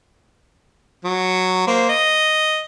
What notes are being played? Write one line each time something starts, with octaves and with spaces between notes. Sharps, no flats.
F#3
A#3 C5
D#5